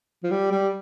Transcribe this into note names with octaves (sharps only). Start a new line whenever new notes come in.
F3
G3
G3